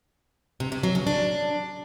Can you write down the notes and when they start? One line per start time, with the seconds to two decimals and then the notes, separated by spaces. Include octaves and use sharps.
0.60 C3
0.72 C3
0.83 F#3
0.95 C#3
1.07 D4